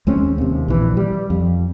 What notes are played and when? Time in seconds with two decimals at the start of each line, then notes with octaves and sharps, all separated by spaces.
0.07 D#2 G#3 C4 C#4
0.38 D#2 C3
0.68 A#1 E3
0.97 G3
1.30 F2